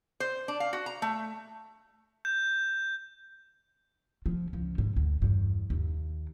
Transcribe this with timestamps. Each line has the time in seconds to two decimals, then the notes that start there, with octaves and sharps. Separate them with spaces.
0.20 C5
0.48 D4
0.60 F5
0.73 F#4
0.86 A#5
1.02 A3
2.25 G6
4.26 F3
4.53 C#2 F3
4.78 G#2
4.96 D2
5.22 E2 G2
5.70 D#2